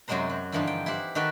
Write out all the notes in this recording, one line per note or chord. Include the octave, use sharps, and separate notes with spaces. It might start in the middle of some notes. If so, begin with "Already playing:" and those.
F#2 C3 F#3 G#3 C5 A#5
F#3
G2 D3 E3 F3 C4 D#4
G5
E4 G4 C5 F#5
D#3 D#4 F#4 A4 B4 G5